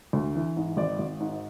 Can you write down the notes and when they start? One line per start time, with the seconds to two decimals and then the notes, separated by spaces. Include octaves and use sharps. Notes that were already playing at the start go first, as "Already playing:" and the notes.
0.13 D2
0.35 E3
0.57 G#2
0.77 G#1 D5
0.99 G#1
1.20 G#2